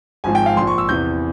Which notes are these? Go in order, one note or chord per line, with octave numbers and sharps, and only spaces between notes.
G#1 G#2 F3 G#5
G5
F5
A#1 A#2 F3 C6
C#6
E6
E2 C3 E3 G6